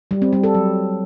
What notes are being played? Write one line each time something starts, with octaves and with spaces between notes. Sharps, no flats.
G3
C4
G3
A4
F#3